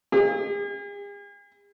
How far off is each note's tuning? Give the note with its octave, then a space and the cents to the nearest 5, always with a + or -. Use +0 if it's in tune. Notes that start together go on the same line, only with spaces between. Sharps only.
G#4 -45